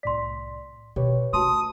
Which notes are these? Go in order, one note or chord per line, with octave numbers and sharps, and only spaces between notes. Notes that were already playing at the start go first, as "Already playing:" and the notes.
C2 A2 D5 C6 B6
B2 G4 B4 C#5
A3 F#4 A5 C6 D#6